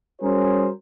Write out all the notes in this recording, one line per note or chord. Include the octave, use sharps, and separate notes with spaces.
G3 C#4 F#4 G#4 A#4 C5